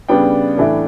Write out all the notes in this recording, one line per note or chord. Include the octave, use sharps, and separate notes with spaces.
C#3 G3 B3 D4 G5
A2 E3 A3 D4